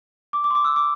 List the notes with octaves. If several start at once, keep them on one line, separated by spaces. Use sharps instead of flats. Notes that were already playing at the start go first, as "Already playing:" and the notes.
D6
D6
C6
D6
E6
D6